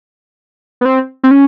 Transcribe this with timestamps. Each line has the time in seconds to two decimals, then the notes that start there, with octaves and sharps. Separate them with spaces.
0.81 B3
0.85 C4
1.23 C4
1.31 C#4